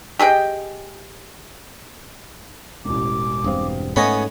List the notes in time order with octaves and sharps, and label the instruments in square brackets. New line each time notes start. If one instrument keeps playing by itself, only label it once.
[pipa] G4 G#4 D#5 G5
[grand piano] E1 A1 [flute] D6
[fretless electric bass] E1 G2 C4 [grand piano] F5 D#6
[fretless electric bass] G#2 A3 C#4 [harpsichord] B3 C#5 D#5 [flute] G#5